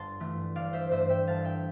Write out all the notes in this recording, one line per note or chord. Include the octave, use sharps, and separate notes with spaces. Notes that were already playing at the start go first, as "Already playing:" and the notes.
Already playing: G1 A5 C6
G2 E3 A3
G1 D5 F5
C5 E5
G2 E3 A3 C5 E5
E5 G5
G1 F5 A5
E5 G5